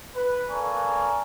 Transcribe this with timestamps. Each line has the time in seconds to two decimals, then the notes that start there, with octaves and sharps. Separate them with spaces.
0.16 B4
0.51 A#3 A4 D5 G#5 A#5 C#6